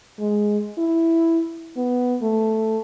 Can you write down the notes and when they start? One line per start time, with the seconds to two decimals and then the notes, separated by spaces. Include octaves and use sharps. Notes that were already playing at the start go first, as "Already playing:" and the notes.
0.20 G#3
0.78 E4
1.77 B3
2.22 A3